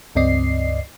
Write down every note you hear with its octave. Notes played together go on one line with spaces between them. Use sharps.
C#2 G2 C4 D5 D#5 C7